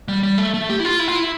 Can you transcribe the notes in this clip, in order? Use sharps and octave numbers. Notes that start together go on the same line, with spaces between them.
G3
G3
A3
A3
G4
E4
F4
E4
F4
E4